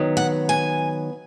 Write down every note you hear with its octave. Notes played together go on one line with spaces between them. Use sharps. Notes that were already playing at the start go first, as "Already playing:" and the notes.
Already playing: D#3 F#3 B3
F#5
G#5